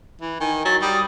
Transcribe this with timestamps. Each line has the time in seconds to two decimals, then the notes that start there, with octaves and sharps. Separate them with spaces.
0.21 E3
0.40 D#3 G#5
0.65 F#3 A6
0.82 G3 D#6